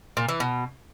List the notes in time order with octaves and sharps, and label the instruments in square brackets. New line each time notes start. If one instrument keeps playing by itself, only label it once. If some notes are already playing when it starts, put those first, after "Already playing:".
[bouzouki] A#2
E3
B2